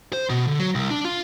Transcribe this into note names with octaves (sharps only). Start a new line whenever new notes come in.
C5
B2
D3
F#3
C2
D4
F4